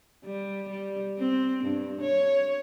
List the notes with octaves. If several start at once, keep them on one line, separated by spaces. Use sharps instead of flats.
G3
G3
C4
G2
C#5